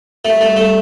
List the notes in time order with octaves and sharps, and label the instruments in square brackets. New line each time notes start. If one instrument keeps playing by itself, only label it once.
[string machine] G3 [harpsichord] A3
[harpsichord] A3
A3